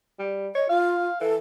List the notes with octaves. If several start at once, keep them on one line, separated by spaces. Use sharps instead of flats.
G3
C#5 D#5
F4 F5
E3 A4